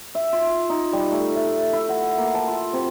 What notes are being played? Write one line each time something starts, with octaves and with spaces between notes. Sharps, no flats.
E5
F4
D#4
G3
A3
E5
E4
F#5
A#3
A5
F4
C3